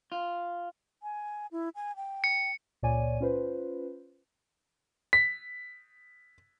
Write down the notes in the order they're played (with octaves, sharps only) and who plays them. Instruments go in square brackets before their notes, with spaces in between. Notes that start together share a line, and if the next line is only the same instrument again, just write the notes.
[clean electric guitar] F4
[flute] G#5
E4
G#5
G5
[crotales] C#7
[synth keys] C#2 A#2 C#5 D5 G#5 D#7
C#4 F4 B4 C5
[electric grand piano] B6